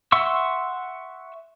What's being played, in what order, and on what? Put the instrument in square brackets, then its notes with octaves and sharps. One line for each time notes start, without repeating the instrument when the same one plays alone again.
[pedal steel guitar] E5 F#5 C6 C#6 E6